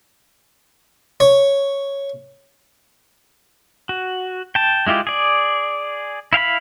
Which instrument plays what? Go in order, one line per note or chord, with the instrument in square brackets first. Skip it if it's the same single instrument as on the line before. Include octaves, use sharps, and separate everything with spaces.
[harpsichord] C#5
[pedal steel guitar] F#4
G5 A5
G#3 E4 F4 G4
G#4 D5
E4 F5 G5 B5